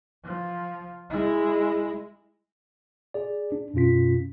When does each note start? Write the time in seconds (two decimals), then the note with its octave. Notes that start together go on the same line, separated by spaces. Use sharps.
0.24 F3
1.10 G#3 E4
3.14 G#4 D5
3.52 D4
3.74 F#2 B2 C#4 F4 B6